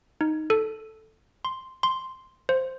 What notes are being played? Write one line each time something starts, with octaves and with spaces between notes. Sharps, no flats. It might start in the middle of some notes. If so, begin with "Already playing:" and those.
D#4
A4
C6
C6
C5